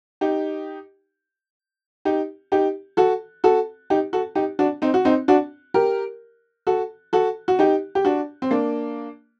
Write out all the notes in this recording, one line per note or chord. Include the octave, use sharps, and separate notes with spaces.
D#4 G4
D#4 G4
D#4 G4
F#4 A4
F#4 A4
D#4 G4
F#4 A4
D#4 G4
D4 F#4
C4 D#4
F#4
C4 D#4
D4 F#4
G4 A#4
F#4 A4
F#4 A4
F#4
D#4 G4
G4
D4 F#4
C4
A#3 D4